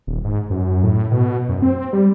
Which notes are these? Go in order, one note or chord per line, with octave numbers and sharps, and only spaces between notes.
D#1
G#2
F#2
A2
B2
F#2
C4
G3